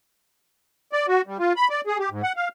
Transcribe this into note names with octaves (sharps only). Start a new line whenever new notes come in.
D5
F#4
G3
F4
B5
D5
G#4
G4
G#2
F#5
F5